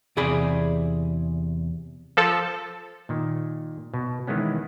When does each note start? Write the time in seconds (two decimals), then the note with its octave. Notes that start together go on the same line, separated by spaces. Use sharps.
0.17 E2 C3 G#4 D5 B5
2.17 F3 A4
3.09 A#2 D#3
3.94 B2
4.27 D#3 E3 G#3 B3 C#4